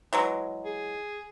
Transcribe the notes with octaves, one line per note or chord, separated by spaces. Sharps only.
E3 F#3 G#3
G#4